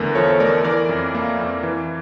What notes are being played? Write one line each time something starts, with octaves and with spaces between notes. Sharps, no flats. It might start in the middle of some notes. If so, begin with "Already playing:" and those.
Already playing: E2 D3 A3 A#4
F3 A4 C#5
A3 A#4 D5
E3 A#4 D5
F2
A#3
F2
E3